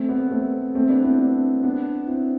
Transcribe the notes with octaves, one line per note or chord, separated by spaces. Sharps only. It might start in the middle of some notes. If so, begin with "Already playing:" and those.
Already playing: A3 C4
B3
A3 C4
A3 C4
B3 D4
C4 E4
B3 D4
B3 D4
C4 E4